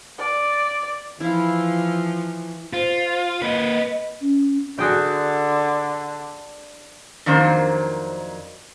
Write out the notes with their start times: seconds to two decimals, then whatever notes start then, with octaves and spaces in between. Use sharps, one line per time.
0.18 D5
1.20 E3 F3 E4 F4 F5
2.73 F4 C5
3.42 A#3 B4 D#5
4.21 C#4
4.79 D3 F#4 G#4 G5
7.26 F2 D#3 F#3 A#3 D4 C5